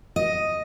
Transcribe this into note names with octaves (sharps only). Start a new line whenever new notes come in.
D#5